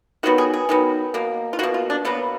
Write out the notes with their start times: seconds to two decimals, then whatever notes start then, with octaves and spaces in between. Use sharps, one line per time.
0.23 D#3 F#3 B3 F#4
0.38 G#4
0.54 G#4
0.69 D#3 F#3 B3
1.14 B2 A#3
1.53 F4
1.59 B2 A#3 F#4
1.74 F4
1.90 D4
2.05 B2 F#3 A#3 B3